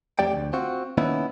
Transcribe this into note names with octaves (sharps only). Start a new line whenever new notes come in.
F2 A3 G4 D5 G5
D2
C4 F4 F#4
D#3 A#3 B3 C#4 D#4 E4